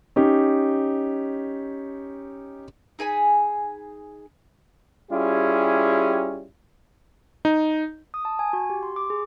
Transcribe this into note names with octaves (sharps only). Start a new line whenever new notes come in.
C#4 D#4 G4
D#4 G#4 G#5 B5
G3 C#4 E4 F4 G4 G#4
D#4
D#6
A5
G#5
F#4
G4
C6
D6
G#4